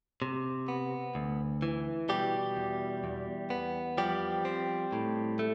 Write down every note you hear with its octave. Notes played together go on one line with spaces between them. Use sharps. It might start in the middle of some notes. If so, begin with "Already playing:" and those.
C3
B3
D2
E3
B2 G3 G4
E2
E2
B3
F3 G3 G4
C4
A2
A3